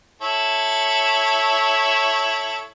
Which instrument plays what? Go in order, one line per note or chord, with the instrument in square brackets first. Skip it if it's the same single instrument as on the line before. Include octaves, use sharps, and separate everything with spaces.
[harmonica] E4 A4 C#5